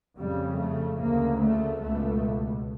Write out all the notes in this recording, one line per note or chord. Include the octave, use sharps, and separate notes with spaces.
F2 C#3 G3
A3
D2 C#3 A#3
A3
C#2 B2 A3